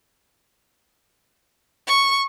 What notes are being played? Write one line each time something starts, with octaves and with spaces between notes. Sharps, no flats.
C#6